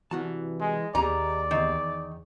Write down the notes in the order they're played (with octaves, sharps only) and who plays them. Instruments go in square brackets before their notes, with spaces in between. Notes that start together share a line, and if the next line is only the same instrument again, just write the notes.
[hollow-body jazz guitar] C2 F#4 A5 [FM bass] E3
[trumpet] G#3
[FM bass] D#2 [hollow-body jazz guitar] D#4 G4 G#4 [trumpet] D5 [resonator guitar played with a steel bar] A#5
[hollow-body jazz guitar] E2 D#4 [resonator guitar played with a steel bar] D#3